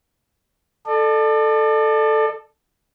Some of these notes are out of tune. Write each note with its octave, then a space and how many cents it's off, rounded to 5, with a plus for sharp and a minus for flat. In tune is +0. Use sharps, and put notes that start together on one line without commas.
A4 +0 D5 +40